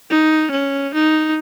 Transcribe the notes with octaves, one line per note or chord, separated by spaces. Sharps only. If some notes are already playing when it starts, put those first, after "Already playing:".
D#4
C#4
D#4